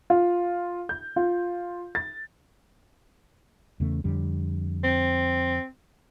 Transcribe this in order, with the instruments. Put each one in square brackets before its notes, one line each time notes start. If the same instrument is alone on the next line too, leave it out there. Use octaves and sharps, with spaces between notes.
[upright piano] F4
G6
F4
A6
[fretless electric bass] E2 C#3 A3
F2 D3 G3
[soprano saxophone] C4